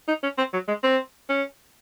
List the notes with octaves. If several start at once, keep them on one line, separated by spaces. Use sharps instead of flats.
D#4
C#4
C4
F#3
G#3
C4
C#4